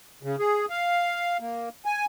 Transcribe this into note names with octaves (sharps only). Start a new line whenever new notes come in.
C#3
G#4
F5
A#3
G#5